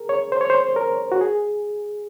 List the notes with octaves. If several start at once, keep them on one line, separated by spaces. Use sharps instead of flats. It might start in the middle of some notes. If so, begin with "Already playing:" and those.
Already playing: G#4 A#4
C#5
C5
C#5
C5
A#4
F#4
G#4